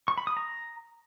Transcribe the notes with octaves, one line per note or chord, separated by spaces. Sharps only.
C#6
B5
D#6
A#5